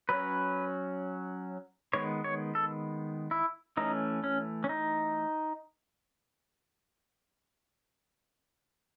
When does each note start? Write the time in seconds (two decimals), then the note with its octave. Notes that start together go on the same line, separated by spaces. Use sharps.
0.09 F#3 C#4 B4
1.93 D#3 G#3 B3 C#5
2.24 C#5
2.55 A4
3.31 E4
3.77 E3 A3 C#4 D#4
4.24 C#4
4.64 C#4
4.69 D#4